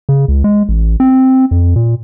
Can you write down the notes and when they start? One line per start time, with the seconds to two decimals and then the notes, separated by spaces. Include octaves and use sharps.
0.09 C#3
0.28 C#2
0.44 G#3
0.69 A1
1.00 C4
1.51 F2
1.76 A#2